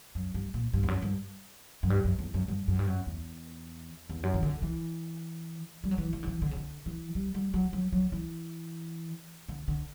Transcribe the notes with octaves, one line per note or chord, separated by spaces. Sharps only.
F#2
G2
A#2
G2
E2
F#2
G2
F#2
G2
F#2
E2
F#2
G2
F#2
G2
F#2
E2
E2
F#2
E3
D3
E3
G3
F#3
E3
E3
D3
E3
D3
C#3
D3
E3
G3
G3
F#3
F#3
F#3
E3
D3
D3